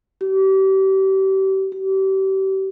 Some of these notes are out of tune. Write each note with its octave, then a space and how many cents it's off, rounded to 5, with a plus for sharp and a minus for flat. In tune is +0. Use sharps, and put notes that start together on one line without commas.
G4 -35
G4 -35